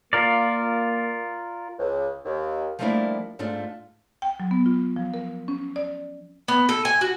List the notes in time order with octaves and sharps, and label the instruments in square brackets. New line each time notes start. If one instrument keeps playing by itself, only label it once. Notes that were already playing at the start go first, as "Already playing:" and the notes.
[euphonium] A#3 [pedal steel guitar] F4 A#4 D5
[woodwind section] C#2
D#2
[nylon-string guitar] F3 G3 A3 A#3 D4 E4
G#2 A3 D4 D#4 F4
[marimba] G5
F#3
B3
F4
F3
A#4
C#4
D5
[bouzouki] B3
A4
G#5
F#4